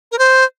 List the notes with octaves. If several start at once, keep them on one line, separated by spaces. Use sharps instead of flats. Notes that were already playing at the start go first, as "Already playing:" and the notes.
A#4
C5